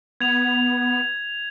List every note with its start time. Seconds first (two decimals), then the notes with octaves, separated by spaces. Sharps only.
0.21 B3 G#6 F7